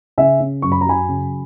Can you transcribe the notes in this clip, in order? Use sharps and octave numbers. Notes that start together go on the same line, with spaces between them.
C#3 E5 G#5
C#4
F#2 C#6
B5
A#5
F#3 G#5 B5
C#3